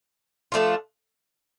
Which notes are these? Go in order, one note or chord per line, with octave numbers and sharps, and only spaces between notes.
F3 A3 D4 F4